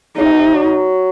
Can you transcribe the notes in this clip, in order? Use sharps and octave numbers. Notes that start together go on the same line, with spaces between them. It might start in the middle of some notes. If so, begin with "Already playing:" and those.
C#3 D#4
C3
B2
C3
F#3